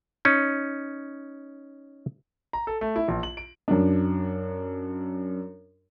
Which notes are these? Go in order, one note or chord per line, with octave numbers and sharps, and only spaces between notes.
C#4 D#4
A#5
A4
A3
E4
A#1
F#7
D7
F#2 D4